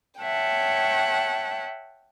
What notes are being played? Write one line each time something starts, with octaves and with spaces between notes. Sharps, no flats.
C#5 E5 F#5 G5 A5